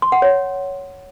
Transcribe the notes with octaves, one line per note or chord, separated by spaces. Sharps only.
C6
F#5
C#5